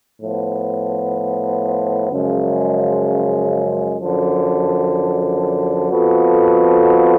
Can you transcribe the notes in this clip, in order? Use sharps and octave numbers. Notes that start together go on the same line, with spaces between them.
A2 F3 B3
F#2 C#3 F3 G#3
F#2 D3 F3
F2 F3 B3 F#4 A4